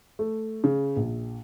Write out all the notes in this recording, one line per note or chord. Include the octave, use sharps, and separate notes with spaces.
A3
C#3
A#1